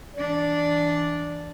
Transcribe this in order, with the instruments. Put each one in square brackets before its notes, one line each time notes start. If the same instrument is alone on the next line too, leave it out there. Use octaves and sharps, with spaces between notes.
[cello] E3 D4 [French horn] D5